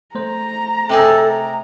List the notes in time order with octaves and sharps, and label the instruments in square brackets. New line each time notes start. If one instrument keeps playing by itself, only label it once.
[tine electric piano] A3 C5 [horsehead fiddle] A#5
[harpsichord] C3 D#4 G#4 [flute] A4
[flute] A#5